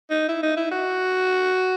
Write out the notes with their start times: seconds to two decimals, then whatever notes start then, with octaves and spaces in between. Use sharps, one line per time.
0.10 D#4
0.29 E4
0.43 D#4
0.57 E4
0.71 F#4